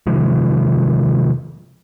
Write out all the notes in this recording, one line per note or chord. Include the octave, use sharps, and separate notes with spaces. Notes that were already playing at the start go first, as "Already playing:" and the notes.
C3 D#3 F3 G#3